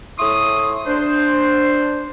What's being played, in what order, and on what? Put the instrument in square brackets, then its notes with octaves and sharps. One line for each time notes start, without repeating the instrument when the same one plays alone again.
[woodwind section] A2 E4 C6 C#6 D#6
D4 C5